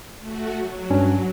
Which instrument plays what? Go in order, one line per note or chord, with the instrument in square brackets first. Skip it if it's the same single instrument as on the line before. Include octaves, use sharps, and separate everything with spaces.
[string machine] A3 F#4
F#3
[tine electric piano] G2 C#4 D4